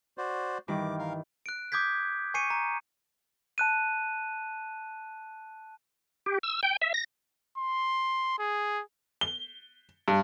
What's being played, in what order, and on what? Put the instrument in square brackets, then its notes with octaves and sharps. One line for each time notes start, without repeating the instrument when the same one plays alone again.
[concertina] F#4 C5 D5
[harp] G2 D#3 E3 [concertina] D6
[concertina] A#4 F5
[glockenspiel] F#6 D7
D6 D#6 G6 G#6 B6
G#5 C#6 C7 C#7 D#7
A#5
A5 F#6 D#7
[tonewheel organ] G4
E6
G5
E5
A#6
[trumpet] C6
G#4
[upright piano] G7
G2